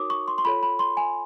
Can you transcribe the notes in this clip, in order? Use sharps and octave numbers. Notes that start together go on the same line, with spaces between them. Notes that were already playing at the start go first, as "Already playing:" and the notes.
Already playing: D#4 F#4 A#4 C#5 D6 D#6
C#6
C6
C6
F4 A4 C#5 B5
B5
C6
G#5